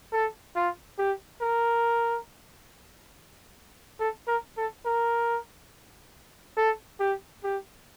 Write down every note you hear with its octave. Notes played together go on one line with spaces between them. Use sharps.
A4
F4
G4
A#4
A4
A#4
A4
A#4
A4
G4
G4